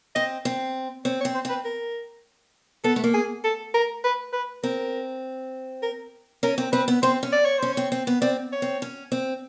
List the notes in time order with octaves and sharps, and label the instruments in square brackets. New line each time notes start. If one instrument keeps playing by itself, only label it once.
[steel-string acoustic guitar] C4 [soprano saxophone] D#5
[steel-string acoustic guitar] C4
[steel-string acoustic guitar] C4 [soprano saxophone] C#5
[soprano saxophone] C#5
[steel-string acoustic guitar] C4
[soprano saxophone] C5
[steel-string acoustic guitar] C4 [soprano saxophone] B4
[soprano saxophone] A#4
[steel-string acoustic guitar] B3 [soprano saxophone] A4
[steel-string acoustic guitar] A3
A#3
[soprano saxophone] G#4
A4
A#4
B4
B4
[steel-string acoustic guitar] C4 [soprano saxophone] A#4
[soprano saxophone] A#4
[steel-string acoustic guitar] C#4 [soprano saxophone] A#4
[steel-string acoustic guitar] C4
[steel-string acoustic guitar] C4 [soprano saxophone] B4
[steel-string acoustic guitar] B3
[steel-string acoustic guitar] C4 [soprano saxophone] C5
[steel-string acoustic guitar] C#4
[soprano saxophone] D5
C#5
[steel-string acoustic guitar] C#4 [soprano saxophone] C5
[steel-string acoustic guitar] C4 [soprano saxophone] C#5
[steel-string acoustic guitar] C4
B3
[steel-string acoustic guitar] C4 [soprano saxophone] D5
[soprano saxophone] C#5
[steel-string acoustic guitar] C4
C#4
C4